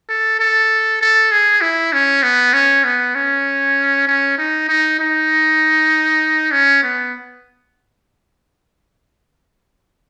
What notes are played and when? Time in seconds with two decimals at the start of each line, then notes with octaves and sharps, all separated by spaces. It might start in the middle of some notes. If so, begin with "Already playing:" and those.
0.09 A4
0.39 A4
1.01 A4
1.32 G#4
1.61 E4
1.93 C#4
2.23 B3
2.54 C#4
2.84 B3
3.15 C#4
4.07 C#4
4.38 D#4
4.68 D#4
4.99 D#4
6.52 C#4
6.83 B3